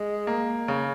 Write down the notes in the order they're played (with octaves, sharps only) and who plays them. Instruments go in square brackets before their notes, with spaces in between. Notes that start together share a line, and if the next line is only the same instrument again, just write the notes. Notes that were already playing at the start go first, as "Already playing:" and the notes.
Already playing: [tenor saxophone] G#3
[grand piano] A#3
C#3